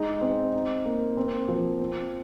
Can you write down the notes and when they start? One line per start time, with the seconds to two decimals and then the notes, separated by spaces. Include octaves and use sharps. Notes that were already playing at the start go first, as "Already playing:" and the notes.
Already playing: G#3 D#4
0.21 C4
0.53 D#4
0.85 A#3
1.17 C4
1.48 F3
1.80 C4